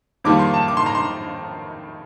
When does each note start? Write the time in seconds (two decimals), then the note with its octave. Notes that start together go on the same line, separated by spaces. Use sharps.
0.24 F2 D#3 G3 A#3 D6
0.39 C6
0.54 A5
0.68 D6
0.77 C6
0.86 A#5
0.95 C6